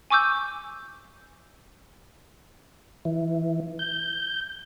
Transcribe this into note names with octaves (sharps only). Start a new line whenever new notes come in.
G#5 C#6 D6 E6 G6
E3
G6